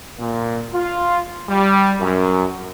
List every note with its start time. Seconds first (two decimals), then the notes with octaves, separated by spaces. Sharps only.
0.19 A#2
0.74 F4
1.49 G3
2.00 F#2